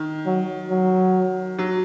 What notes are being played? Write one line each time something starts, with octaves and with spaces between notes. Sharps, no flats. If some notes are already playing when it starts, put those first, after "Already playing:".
Already playing: D#3
F#3
F#3
F#3